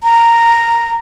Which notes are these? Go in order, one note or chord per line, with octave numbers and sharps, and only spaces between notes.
A#5